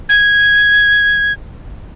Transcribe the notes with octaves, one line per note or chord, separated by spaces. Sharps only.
G#6